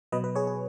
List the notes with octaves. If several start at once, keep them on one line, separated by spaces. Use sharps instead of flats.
B2 F#3 B4 D#5
B4
G#4 C#5
G#4